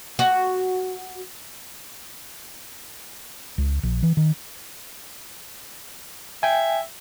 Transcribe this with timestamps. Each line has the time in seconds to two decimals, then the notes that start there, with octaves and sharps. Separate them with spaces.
0.19 F#4
3.58 C#2
3.83 A#1
4.03 E3
4.17 D#3
6.43 E5 G5 G#5